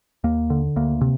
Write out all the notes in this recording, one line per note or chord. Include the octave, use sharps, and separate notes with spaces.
D#2 A#3
D3
D2 A#3
C3